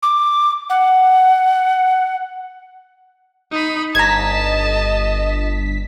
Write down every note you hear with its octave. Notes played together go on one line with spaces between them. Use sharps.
D6
F#5
D#4 B5
G1 D#5 A5 A#5 G#6 B6